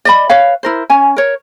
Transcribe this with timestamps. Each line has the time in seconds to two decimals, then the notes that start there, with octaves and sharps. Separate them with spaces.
0.05 D5 D#5 B5
0.29 B4 C#5 F5
0.63 E4 A#4 C5
0.90 C#4 G#5
1.16 A#4 C#5